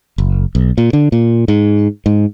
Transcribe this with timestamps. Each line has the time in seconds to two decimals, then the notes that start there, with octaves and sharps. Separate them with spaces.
0.18 F#1
0.55 B1
0.78 A#2
0.93 D3
1.12 A#2
1.48 G#2
2.06 G#2